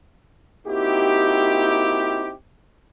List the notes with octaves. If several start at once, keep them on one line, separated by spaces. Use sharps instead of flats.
A#3 C4 D#4 E4 F#4 G4